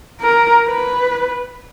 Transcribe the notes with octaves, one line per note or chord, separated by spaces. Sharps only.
A#4
B4